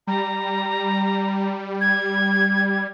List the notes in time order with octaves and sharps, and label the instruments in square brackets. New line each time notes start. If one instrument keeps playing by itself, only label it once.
[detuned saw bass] G3 [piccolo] A#5
[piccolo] G#6